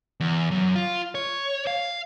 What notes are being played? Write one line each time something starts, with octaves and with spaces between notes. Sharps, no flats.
E2
F#2
F4
C#5
F5